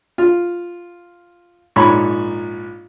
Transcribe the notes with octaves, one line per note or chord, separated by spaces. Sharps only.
F4
A#1 G#2 C#5 B5